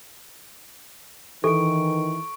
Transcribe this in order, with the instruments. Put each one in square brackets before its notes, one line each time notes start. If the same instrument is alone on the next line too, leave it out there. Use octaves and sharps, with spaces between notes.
[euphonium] D#3 [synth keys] E3 [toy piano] A4 [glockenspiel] C#6 D7